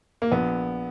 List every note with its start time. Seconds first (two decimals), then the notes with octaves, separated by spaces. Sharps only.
0.22 A#3
0.32 A#1 B3